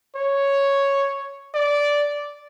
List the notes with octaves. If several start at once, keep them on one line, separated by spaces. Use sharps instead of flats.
C#5
D5